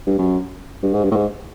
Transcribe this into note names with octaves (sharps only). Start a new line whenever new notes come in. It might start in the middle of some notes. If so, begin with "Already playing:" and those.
G2
F#2
G2
G#2
G2
A2
G#2